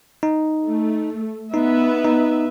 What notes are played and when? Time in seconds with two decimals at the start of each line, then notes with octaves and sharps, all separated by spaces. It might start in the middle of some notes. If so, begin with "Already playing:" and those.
0.23 D#4
0.66 A3
1.54 B3 D#4 B4 E5
2.04 D#4